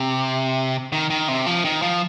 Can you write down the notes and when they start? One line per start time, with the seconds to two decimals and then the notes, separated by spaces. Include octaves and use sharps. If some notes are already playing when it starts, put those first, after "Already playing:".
Already playing: C3
0.92 D#3
1.10 D#3
1.28 C3
1.46 F3
1.65 D#3
1.82 F3